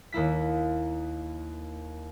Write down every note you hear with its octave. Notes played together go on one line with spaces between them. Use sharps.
D#2 A#3 E4 B6